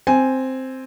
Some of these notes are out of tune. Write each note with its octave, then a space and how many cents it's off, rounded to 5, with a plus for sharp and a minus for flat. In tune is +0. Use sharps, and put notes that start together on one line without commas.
C4 +0 G#5 +0